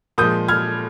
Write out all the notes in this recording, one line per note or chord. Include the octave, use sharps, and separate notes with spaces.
A#2 F3 G#3 D#6 G6
F6 G#6